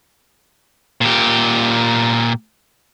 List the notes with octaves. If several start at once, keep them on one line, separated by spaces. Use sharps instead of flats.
A#2 G4